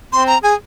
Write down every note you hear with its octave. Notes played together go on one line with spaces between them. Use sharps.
C4 C6
A#5
G#4 G#5